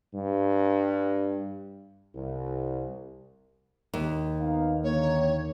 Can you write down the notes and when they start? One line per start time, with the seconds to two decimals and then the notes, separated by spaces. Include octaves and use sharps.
0.14 G2
2.15 C2
3.94 D#2
4.41 B3 D#4 F5
4.83 D3 D#3 A#3 C#5